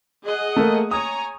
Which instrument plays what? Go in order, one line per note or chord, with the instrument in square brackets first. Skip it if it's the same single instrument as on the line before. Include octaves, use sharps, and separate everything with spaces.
[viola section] G#4 D#5 F#5
[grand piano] A3 A#3
[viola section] C#5 G#5 A#5 [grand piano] D#6